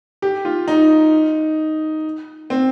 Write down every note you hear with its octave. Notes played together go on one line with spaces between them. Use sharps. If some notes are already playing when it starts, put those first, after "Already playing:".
G4
F4
D#4
C4